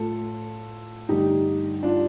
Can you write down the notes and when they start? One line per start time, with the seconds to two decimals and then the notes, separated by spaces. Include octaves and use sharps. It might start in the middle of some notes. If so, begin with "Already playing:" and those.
Already playing: A2 A3 F4 A4
1.09 G2 D3 A3 D#4 G4
1.83 D4 F4